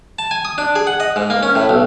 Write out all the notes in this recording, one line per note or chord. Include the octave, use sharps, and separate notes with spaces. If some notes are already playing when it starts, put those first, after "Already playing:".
A5
G#5
D#6
D4
G#4
F#5
D#5
G#2
A#3
C#4
A2
B1